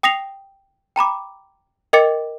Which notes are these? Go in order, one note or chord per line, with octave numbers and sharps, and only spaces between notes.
G5 D#6 A#6 C7 F7
G5 A#5 B5 D6
A#4 D#5 G5 D6 A6 C#7